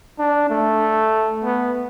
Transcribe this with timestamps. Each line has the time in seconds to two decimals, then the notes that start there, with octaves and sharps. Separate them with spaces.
0.19 D4
0.50 A3
1.44 B3